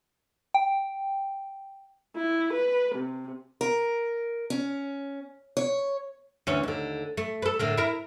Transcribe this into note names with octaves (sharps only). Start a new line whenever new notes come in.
G5
E4
B4
C3
A#4
C#4
C#5
D2 E3 C#4
D#2 D3
A3
A4 B4
A2 D3 A#4
E4 A#4